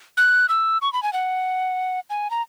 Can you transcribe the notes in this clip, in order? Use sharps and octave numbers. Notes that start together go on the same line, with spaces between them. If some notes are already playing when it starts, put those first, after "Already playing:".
F#6
E6
C#6
B5
G#5
F#5
G#5
A#5